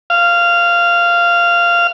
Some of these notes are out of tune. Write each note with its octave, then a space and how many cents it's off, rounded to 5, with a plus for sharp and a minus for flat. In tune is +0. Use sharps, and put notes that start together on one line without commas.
F5 -10